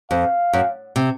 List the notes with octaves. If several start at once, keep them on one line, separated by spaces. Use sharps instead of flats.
F2 F5
F#2
C3